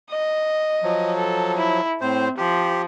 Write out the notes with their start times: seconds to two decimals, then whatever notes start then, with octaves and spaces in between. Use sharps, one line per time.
0.10 D#5
0.83 F3 F#3
1.17 A4
1.57 E4
2.01 A2 C4 C5
2.38 F3 G4